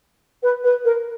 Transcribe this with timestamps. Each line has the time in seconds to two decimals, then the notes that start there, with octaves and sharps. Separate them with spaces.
0.42 B4
0.63 B4
0.84 A#4